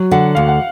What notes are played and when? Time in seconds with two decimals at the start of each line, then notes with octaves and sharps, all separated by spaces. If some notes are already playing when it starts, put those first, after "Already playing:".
Already playing: F#3
0.11 D3 F#5
0.35 D2 F5
0.48 F#5